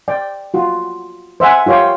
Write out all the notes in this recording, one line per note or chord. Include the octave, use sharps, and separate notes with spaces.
D5 G5
F4 F#4
C5 E5 F#5 G#5
F4 G4 C#5 F5 G5